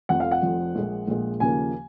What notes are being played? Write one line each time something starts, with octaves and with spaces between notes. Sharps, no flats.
F1 F2 F3 F#5
F5
F#5
F1 F2 F3
A#1 A#2 G#3
A#1 A#2 G#3
D#2 C#3 F3 A#3 G#5